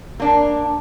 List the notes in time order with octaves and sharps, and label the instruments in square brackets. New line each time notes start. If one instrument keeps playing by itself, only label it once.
[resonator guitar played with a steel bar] A#3 D4